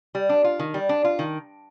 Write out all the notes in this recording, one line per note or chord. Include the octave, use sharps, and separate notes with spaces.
G3
D4
F4
D#3
G3
D4
F4
D#3